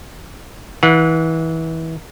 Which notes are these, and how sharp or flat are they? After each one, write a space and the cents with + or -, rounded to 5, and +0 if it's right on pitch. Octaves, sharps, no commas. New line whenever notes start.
E3 -25 F#5 -30